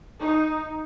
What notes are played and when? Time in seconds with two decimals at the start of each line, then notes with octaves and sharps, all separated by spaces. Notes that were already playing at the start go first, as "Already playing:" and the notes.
0.20 D#4